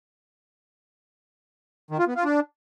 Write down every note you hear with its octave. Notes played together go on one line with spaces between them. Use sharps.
D#3
F4
B3
F4
D4